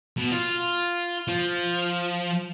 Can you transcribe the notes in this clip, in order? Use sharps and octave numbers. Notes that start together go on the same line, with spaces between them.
B2
F4
F3